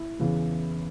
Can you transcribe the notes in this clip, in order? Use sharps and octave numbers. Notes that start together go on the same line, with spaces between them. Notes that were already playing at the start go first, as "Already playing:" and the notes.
Already playing: E4
E2 C#3 E3